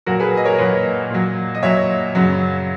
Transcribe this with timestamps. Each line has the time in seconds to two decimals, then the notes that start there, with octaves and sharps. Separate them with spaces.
0.06 A#2 F#3 F#4 A#4
0.20 G#4 B4
0.37 D#5
0.45 A#4 C#5
0.58 A#2 F#3 B4 D#5
1.10 A#2 F#3
1.55 D#5
1.62 A#2 F#3 C#5 E5
2.15 F#2 C#3 F#3